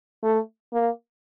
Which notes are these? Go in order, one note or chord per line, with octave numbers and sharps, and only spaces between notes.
A3
A#3